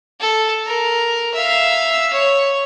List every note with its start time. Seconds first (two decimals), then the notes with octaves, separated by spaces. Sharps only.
0.20 A4
0.66 A#4
1.34 E5 F5
2.13 C#5